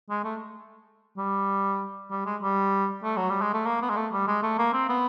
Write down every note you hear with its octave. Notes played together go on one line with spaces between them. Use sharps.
G#3
A3
G3
G3
G#3
G3
A3
F#3
G3
G#3
A3
A#3
B3
G#3
A3
G3
G#3
A3
A#3
C4
B3